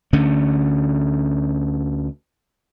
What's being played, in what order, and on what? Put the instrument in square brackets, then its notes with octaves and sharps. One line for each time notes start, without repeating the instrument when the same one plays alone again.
[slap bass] D2 D3 A3 C#4